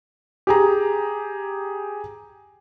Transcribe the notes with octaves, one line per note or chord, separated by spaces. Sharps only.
G4 G#4 A#5